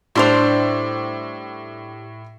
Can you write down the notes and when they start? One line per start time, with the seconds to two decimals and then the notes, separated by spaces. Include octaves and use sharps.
0.15 A2 G3 D4 C5 C6 F7